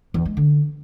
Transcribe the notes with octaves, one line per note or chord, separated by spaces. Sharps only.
E2
G#3
D3